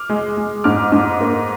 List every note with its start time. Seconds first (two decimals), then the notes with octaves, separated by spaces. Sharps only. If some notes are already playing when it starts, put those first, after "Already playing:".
Already playing: D6 F6
0.10 G#3
0.37 G#3
0.64 G#2 D6 F6
0.92 G#2
1.21 A#3